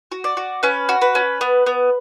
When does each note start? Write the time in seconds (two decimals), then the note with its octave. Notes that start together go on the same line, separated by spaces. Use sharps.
0.12 F#4
0.24 D5
0.37 F#4
0.63 C#4 B4
0.89 F#4
1.01 B4
1.15 C#4
1.41 B3
1.66 B3